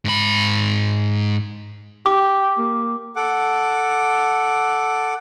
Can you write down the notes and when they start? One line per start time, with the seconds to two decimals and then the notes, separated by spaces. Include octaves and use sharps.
0.05 G#2 B5
2.06 G4 D6
2.58 A#3
3.16 A4 F#5 D6